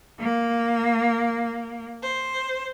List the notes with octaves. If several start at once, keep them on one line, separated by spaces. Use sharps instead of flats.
A#3
C5